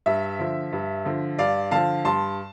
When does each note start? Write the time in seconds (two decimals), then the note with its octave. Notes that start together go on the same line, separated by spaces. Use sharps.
0.06 G2 E5
0.39 D3 F3
0.72 G2
1.05 D3 F3
1.38 G2 D5 F5
1.71 D3 F3 F5 A5
2.05 G2 A5 C6